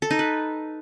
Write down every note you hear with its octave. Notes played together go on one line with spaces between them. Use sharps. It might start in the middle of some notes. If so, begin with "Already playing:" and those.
A4
D#4
B4